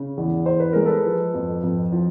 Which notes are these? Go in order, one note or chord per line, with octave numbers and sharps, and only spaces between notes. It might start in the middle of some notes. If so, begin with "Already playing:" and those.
Already playing: C#3
E2
E2 C5
B4
G#3 A#4
A4 B4
F3
F2
F2
F3